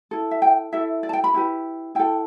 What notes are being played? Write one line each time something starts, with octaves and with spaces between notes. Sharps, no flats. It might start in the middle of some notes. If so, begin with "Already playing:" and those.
E4 A4
E5
G5
E4 A4 E5
D5
A5
G5
B5
E4 G4 B4
E4 A4 G5